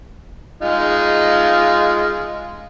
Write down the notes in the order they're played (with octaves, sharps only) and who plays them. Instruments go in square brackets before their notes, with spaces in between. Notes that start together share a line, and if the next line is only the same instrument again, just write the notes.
[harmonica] G#3 D#4 F4